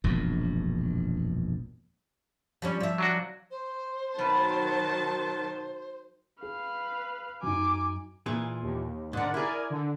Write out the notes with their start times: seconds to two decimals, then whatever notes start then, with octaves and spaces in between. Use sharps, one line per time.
0.04 E1 A#1 F#2
2.62 F3 G3 C#4
2.80 F3 E5
2.98 F#3 D4 F#4
3.51 C5
4.18 B2 D#3 F#3 B4 A5
6.42 G#4 B4 F5
7.43 F#2 D#4 G#5 D6
8.26 A#2 E3 G#4
8.62 D#2
9.13 G#2 D3 A#4 D5 F#5
9.34 E4 G#4 A#4 D5 G#5
9.70 D3